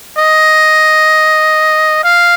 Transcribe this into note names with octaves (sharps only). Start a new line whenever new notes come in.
D#5
F5